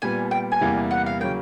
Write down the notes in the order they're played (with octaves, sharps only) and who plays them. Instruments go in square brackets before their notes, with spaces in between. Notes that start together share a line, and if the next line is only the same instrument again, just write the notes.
[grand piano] A#2 G3 B3 [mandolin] G#5
[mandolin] G5
G#5
[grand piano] E2 C3 E3 G3 A#3
[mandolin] F#5
F5
[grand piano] C#3 F#3 A#3 [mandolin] G5